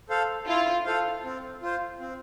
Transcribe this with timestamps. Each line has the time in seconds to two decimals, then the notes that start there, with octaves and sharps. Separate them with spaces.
0.09 A4 C5 F5
0.47 E4 F4
0.86 A4 C5 F5
1.24 C4
1.62 F4 C5
2.00 C4